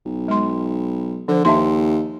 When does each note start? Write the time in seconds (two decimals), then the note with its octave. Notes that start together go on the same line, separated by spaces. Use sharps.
0.06 B1
0.28 G#3 C6
1.28 D3 F3 C5
1.45 D#2 D#4 E5 C6